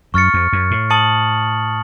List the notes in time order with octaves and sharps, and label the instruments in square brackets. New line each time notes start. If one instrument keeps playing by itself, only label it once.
[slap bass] F#2 [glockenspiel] C#6 F6 A6 C#7
[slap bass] F2
F#2
A2
[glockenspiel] A5 D#6 A6 C#7 F#7